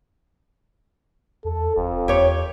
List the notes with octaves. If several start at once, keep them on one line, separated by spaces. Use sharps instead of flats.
E2 A4
F1 F2
E2 G4 C#5